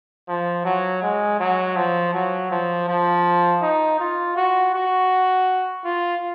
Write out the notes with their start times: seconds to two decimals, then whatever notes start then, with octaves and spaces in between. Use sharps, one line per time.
0.28 F3
0.65 F#3
1.02 G#3
1.39 F#3
1.76 F3
2.13 F#3
2.51 F3
2.88 F3
3.62 D#4
4.00 F4
4.36 F#4
4.74 F#4
5.84 F4